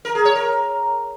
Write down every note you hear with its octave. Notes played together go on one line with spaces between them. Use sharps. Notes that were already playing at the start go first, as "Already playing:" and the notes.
A#4
G#4
C#5
A#4